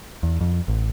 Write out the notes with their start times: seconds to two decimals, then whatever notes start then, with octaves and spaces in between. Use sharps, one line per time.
0.23 E2
0.41 F2
0.68 A1